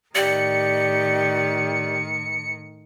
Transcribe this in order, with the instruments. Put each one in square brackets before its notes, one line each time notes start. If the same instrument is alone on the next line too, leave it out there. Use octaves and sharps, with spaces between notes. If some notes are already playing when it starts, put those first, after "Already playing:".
[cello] A2 D#3 [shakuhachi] G4 [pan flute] D5 [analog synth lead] C#7